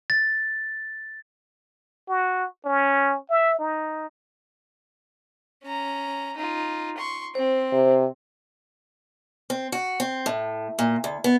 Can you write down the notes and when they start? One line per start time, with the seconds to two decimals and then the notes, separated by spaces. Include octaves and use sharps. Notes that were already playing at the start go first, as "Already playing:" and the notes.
0.10 A6
2.09 F#4
2.65 C#4
3.30 E5
3.59 D#4
5.63 C#4 A#5
6.37 D#4 F4
6.97 C6 C#6
7.35 C4 C5
7.73 C3
9.50 C4
9.72 F#4
10.00 C4
10.26 A2
10.79 A#2
11.04 D2
11.24 B3